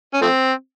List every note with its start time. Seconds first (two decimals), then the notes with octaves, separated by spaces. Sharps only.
0.14 C#4
0.21 F3 A3 C4